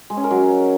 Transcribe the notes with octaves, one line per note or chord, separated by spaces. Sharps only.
G#3
C#4
A#4
F#3